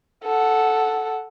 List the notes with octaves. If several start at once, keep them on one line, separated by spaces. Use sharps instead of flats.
A4 F#5